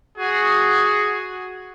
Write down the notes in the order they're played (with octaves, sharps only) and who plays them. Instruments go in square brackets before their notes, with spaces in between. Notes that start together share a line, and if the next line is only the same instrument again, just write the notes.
[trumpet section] F#4 G#4